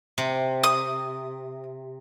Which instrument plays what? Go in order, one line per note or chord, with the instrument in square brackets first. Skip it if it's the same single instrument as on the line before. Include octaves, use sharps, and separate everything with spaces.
[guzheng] C3
[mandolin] D#6